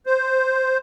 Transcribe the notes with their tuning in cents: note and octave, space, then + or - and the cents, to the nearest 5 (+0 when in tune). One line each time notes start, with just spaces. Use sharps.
C5 +0